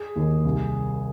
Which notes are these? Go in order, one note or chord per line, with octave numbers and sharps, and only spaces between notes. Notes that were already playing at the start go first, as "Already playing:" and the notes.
Already playing: G#4
D#2 D#3
C2